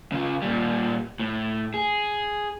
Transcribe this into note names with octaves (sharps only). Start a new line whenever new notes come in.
C#3 F4
A#2 G3
A2
G#4